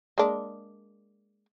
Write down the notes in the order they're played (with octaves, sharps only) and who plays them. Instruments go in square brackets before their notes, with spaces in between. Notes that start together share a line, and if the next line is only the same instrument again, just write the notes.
[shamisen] G#3 A#3 D4